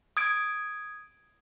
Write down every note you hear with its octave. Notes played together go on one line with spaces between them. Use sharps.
D#6 G#6 D7